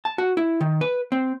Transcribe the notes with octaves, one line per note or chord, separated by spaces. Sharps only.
A5
F#4
E4
D#3
B4
C4